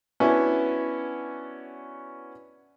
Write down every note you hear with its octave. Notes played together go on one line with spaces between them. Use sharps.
B3 C#4 D4 E4 F#4 G#5